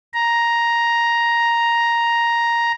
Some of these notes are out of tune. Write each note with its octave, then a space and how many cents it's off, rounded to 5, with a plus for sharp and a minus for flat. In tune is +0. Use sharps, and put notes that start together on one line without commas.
A#5 +5